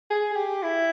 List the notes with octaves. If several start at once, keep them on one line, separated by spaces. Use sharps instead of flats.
G#4
G#4
G4
E4